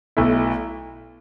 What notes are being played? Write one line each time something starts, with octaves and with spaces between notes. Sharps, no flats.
B1 B2 A3 E4